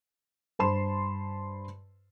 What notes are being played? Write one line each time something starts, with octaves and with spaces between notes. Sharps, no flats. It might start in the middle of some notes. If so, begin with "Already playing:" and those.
G2 C5 A5 B5 C6 E7